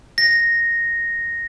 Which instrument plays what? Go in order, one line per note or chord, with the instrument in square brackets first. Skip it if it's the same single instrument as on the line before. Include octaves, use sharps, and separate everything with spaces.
[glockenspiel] A#6